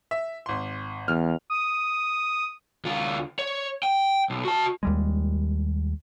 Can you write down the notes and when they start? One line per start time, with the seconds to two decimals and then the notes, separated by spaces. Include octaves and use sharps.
0.11 E5
0.46 G#1 C6
1.08 E2 F6
1.50 D#6
2.85 D2 F4
3.39 C#5
3.83 G5
4.30 B1
4.45 F#4 A5
4.83 D#2 G3 G#3